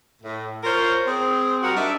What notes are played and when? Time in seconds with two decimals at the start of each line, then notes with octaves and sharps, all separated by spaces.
0.23 A2
0.64 F4 A#4 C5 C#5
1.07 C4 G#4
1.63 G3 F#4 A#4 F#5
1.76 D4 D#4 E5